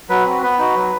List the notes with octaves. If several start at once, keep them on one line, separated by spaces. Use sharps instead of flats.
F#3 B4
C4 F#4
B3 B4
D#4 F#4
F#3